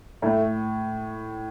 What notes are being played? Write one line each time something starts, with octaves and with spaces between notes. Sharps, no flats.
A2 A3